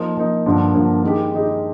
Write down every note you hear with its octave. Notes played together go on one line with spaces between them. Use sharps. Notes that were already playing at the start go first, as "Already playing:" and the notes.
Already playing: F3 A#3 D#4
F3 A#3 D#4
G2 D3 F3 A#3
G2 D3 F3 A#3
D#3 G#3 D#4 G4
D#3 G#3 D#4 G4